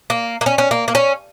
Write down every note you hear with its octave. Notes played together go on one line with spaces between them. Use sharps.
A#3
A#3
C#4
C#4
A#3
A#3
C#4